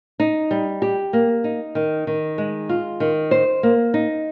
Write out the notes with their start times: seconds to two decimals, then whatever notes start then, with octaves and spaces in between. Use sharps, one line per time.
0.20 D#4
0.51 G3
0.82 G4
1.13 A#3
1.44 D#4
1.75 D#3
2.07 D#3
2.38 G#3
2.69 F4
3.00 D#3
3.31 C5
3.63 A#3
3.94 D#4